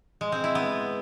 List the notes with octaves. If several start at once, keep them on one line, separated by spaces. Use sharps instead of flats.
G#3
C4
E4
B3